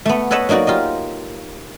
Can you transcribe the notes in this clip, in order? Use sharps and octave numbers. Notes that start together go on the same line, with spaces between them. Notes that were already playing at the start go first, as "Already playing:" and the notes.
A3 B3
A4 B4 C#5 D#5 F#5 A5
F#3 A#3 D#4 F#4 D5
F4 G4 D#5